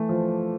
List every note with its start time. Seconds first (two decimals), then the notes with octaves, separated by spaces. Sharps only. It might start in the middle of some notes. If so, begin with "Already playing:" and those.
Already playing: E3 A3
0.09 F3